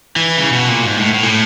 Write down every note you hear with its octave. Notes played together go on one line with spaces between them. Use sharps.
E3
C#3
B2
A#2
G#2
A2
A2
A#2
A2